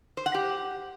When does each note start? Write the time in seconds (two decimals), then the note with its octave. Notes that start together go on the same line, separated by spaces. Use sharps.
0.17 C5
0.26 F#5
0.34 G4